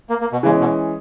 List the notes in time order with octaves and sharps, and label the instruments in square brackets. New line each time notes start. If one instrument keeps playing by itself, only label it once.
[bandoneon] A#3
A#3
B2
[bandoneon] C#3 [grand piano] E3 G#3 C#4
[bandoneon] B2